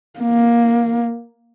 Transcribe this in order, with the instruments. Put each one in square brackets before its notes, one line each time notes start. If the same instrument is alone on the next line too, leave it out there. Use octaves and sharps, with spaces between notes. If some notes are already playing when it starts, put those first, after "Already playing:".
[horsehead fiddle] A#3